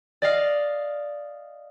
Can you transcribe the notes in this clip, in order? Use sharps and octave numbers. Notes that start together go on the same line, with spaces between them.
D5 D#5 F5